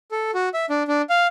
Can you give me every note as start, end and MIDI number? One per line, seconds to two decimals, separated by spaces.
0.11 0.31 69
0.34 0.49 66
0.54 0.66 76
0.70 0.83 62
0.88 1.02 62
1.10 1.27 77